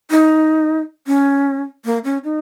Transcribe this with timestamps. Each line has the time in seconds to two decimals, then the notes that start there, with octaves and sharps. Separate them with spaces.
0.11 D#4
1.07 C#4
1.85 A#3
2.04 C#4
2.24 D#4